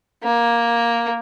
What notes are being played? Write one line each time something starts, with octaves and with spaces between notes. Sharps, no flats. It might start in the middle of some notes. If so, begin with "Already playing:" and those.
A#3